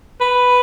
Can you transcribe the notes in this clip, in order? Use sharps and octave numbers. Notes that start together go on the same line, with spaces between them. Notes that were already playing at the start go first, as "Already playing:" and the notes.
B4